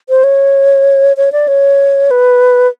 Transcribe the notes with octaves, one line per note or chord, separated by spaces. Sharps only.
C5
C#5
C#5
D5
C#5
B4